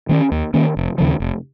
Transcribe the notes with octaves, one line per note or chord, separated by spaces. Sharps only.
D#3 A#3 C#4
D#2
D#3 A#3 C#4
F1
D#2 C#3 F3
F1